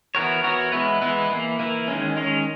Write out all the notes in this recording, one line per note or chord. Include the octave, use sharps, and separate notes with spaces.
E3 B3 F#4 A#4 C#5
E3 B3 F#4 A#4 C#5
E3 G#3 B3 E4 B4
E3 G#3 B3 E4 B4
E3 A#3 E4
E3 A#3 E4
D#3 G#3 C#4
D#3 G#3 C#4